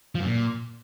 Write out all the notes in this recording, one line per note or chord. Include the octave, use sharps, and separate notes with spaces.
F3
F#2
A#2